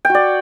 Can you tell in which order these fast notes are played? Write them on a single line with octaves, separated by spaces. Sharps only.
G5 F#4 D5